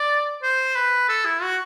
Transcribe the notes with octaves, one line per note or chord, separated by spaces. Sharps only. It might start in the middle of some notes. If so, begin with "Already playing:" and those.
Already playing: D5
C5
B4
A4
E4
F#4